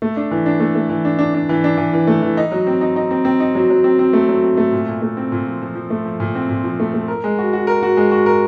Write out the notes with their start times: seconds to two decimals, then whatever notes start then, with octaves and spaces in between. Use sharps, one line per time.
0.02 A3
0.17 D4
0.31 E3
0.46 D4
0.60 A3
0.75 A3
0.89 E3
1.05 D4
1.19 D4
1.34 D4
1.49 E3
1.64 D4
1.78 E3
1.93 E3
2.07 A3
2.22 E3
2.37 D#4
2.52 F#3
2.67 C4
2.81 D#4
2.96 D#4
3.11 C4
3.25 C4
3.40 D#4
3.55 F#3
3.70 F#3
3.84 C4
3.99 C4
4.13 A3
4.28 F#3
4.44 C4
4.57 A3
4.73 A#2
4.88 A#2
5.02 A3
5.17 C4
5.32 A#2
5.46 F3
5.61 F3
5.75 F3
5.90 A3
6.06 F3
6.20 A#2
6.35 C4
6.49 A#2
6.64 F3
6.80 A3
6.94 A3
7.08 A#4
7.24 G#3
7.38 F#4
7.53 F#4
7.67 A#4
7.83 F#4
7.97 G#3
8.11 F#4
8.26 A#4